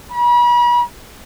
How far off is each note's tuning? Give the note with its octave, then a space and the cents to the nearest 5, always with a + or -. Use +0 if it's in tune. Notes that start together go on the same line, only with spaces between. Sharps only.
B5 -40